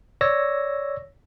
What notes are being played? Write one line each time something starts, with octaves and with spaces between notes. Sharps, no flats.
C#5 D5 E6 A#6